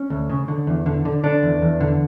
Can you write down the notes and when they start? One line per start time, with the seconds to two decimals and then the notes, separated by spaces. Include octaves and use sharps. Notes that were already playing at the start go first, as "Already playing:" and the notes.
Already playing: C#4
0.10 D2
0.30 C#3
0.48 D3
0.67 E2
0.86 D3
1.05 D3
1.24 D3 D4
1.43 E2
1.62 E2
1.80 D3